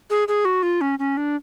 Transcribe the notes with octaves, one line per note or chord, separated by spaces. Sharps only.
G#4
G#4
F#4
F4
C#4
C#4
D4